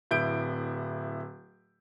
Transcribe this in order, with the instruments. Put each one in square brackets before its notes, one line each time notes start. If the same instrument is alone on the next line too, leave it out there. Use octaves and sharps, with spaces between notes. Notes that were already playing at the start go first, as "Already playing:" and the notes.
[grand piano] D1 E4 G6 D7